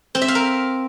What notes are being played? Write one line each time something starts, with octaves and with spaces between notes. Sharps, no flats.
C4
E5
F5
A#4